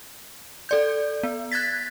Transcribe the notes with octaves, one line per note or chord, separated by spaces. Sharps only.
A4 D5 G6
B3
F#6 G#6 A6 B6